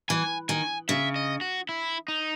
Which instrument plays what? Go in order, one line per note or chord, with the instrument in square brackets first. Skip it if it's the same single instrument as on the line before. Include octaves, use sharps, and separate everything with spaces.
[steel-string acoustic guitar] E3 [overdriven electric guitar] G#5
[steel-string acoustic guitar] D#3 [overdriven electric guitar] G#5
[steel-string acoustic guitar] C#3 [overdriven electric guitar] E5
[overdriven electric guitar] D#5
F#4
E4
D#4